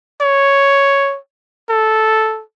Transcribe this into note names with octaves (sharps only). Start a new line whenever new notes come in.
C#5
A4